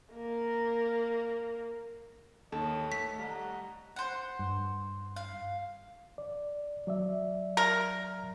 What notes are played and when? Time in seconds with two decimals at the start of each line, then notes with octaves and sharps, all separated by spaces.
0.13 A#3 A#4
2.52 D#2 A4 C#5 D#5
2.92 A3 B6
3.19 G3 D#5 F#5 A#5
3.96 C5 F#5
4.39 G2
5.16 F5
6.18 D5
6.87 F#3 D5 E5
7.57 A#4